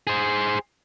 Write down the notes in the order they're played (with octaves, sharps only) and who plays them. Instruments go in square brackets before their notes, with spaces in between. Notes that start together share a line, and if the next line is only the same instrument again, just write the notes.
[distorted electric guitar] G#4 C5